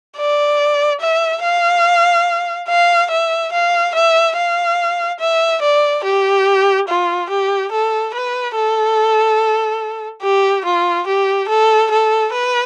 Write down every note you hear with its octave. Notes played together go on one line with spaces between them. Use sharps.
D5
E5
F5
F5
E5
F5
E5
F5
E5
D5
G4
F4
G4
A4
B4
A4
G4
F4
G4
A4
A4
B4